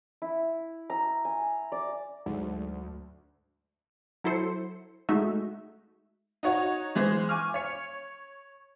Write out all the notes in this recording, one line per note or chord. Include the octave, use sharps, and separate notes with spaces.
E4
A#5
G#5
D5
D2 G#2 F#3
F#3 E4 A4 C5 C7 C#7
G#3 A3 D#4 F#4 E5
D#4 F#4 C#5 F#5
E3 G#3 G#4 C5
G#5 C#6 D6 F6
C#5 C#7